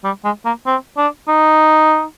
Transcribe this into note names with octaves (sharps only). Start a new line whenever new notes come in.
G3
G#3
A#3
C4
D4
D#4